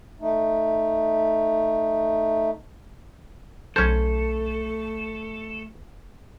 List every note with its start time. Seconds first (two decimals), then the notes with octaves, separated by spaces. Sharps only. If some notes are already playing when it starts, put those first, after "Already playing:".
0.21 A3 D#4
3.76 B1 A3 C#4 A4 C5 G#6 C#7